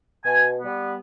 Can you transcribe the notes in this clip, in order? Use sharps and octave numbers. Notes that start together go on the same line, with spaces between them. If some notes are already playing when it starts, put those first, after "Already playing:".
B2 G#5
G3 B3